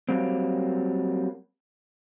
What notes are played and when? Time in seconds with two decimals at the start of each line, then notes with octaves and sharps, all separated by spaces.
0.09 F#3 G3 A#3 C4